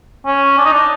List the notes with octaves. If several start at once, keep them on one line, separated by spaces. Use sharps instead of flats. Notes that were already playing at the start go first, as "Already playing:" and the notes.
C#4
D4
D#4
D4